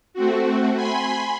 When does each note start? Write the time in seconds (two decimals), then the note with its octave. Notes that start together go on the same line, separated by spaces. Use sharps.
0.14 A3 C4 F#4
0.75 G#5 B5 C6